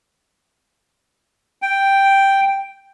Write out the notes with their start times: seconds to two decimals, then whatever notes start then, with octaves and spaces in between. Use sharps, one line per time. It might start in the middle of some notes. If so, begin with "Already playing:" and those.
1.62 G5